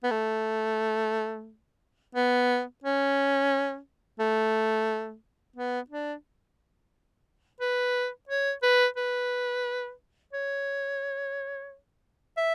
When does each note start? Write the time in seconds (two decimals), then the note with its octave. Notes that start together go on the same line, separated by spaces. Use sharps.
0.04 B3
0.11 A3
2.15 B3
2.84 C#4
4.20 A3
5.56 B3
5.90 D4
7.61 B4
8.29 C#5
8.63 B4
8.97 B4
10.33 C#5
12.38 E5